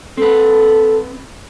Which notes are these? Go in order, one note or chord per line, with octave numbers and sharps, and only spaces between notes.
C4 A4 B4